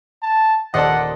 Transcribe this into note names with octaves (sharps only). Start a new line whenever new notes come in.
A5
D#1 A4 C5 D5 D#5 F#5